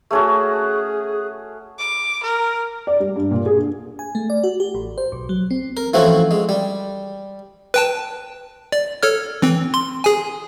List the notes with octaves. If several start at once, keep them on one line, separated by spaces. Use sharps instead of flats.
A3 C#4 F#4 G#4
D6
A#4
D5
G3
G2
A#2
G#4
D4
G#5
A3
D5
F#4
G4
A1
C5
B1
F#3
C4
A#4
E3 F3 A3 C4 C#4 F#4
G#3
G3
B4 G5 A5
D5
A4 C#5 F6
E3 C4
C6
G#4 G#5